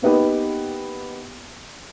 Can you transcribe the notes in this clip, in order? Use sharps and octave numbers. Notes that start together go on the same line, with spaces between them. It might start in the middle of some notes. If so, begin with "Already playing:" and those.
A#3 B3 D#4 G4 B4